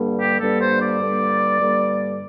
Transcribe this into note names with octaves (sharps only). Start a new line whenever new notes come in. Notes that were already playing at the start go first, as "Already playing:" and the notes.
Already playing: G2 D3 G3 A#3
G4
G2 D3 G3 A#3 A4
C5
D5
G2 D3 G3 A#3
G2 D3 G3 A#3